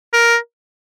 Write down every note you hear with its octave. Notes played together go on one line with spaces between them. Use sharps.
A#4